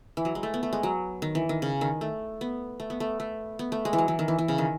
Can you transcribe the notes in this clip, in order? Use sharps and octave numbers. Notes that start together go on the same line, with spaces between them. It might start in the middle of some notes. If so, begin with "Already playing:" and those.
E3
F#3
G#3
A3
B3
A3
G#3
F#3
D#3
E3
D#3
C#3
D#3
A3
B3
A3
B3
A3
A3
B3
A3
G#3
E3
F#3
E3
D#3
E3
E3
C#3
D#3